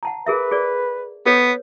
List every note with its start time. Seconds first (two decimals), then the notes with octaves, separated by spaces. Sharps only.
0.03 F#5 A5 A#5
0.26 G#4 A#4 B4 E5
0.51 G#4 D5
1.26 B3 A4 B4 C#5